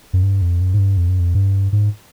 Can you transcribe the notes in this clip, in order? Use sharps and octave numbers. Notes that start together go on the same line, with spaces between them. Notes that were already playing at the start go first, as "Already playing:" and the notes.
F#2
G2
F2
F#2
G#2
G2
F2
F#2
F2
G2
G#2